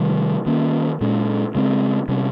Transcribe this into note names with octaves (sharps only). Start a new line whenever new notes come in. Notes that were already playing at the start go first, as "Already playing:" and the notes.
Already playing: C3 D#3 G3
D#3 A#3 C#4
A#2 G#3 C#4
C#3 G#3 C4
C3 G3 C#4